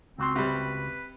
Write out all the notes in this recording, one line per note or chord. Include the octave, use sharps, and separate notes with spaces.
C#2 C4 F#4 C6
C3 G3 B4